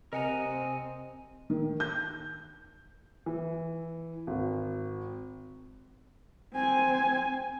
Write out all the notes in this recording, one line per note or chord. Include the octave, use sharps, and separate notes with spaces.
C3 A#4 D#5 F#5 G#5 A#5
C4
D#3
G6
E3
G#1
C4 G#5